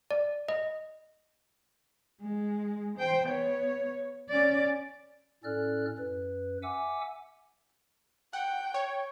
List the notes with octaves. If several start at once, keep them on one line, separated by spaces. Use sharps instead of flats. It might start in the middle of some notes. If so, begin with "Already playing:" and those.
D5
D#5
G#3
C5 G5
B3 C#5
C#4 D5
A2 C#4 A4 D5 F6 F#6
F#2 B4
E5 F#5 G#5 D6 E6
F#5 G5
C#5